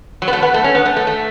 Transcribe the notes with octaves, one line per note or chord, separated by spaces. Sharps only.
F#3
B3
A3
B3
A3
C#4
B3
A3
A3
A3